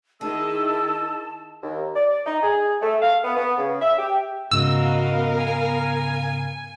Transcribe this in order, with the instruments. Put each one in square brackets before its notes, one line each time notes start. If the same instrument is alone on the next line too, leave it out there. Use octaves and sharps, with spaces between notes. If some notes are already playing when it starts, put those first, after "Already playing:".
[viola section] D#3 E4 D#5 [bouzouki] G#4 [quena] A5 [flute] E6
[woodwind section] D#2
D5
D#4
G#4
A3
F5
B3
B3
C#3
E5
G4
[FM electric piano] G#2 C#3 [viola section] B3 A#4 F5 [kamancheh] F#4 D#5 [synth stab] E6
[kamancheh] G#5